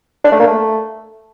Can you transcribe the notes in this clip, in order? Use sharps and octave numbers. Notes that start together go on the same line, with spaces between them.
D4
A3
A#3
A3